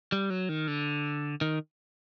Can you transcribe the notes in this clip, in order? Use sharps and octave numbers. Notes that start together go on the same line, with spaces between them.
G3
F#3
D#3
D3
D#3